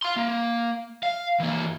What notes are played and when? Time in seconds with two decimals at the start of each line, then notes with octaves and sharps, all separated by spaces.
0.02 F5 C6
0.16 A#3
1.03 F5
1.40 E3 A#3